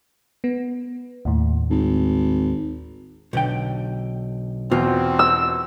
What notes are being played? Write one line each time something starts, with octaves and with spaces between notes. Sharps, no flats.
B3
D#2 A2
G#1
B1 D3 G5
E2 B2 C4 F4
E6